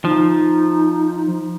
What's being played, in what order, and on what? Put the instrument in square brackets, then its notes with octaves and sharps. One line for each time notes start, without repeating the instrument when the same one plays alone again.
[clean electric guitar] F3 [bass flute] D#4